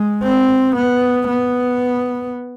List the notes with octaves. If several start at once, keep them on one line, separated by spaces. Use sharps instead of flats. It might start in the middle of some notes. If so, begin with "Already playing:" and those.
Already playing: G#3
C4
B3
B3